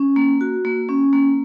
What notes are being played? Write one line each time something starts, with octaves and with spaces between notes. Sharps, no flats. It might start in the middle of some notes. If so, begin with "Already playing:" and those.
Already playing: C#4
A#3
F#4
A#3
C#4
A#3